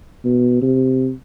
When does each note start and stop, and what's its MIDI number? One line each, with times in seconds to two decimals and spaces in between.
0.25 0.60 47
0.62 1.11 48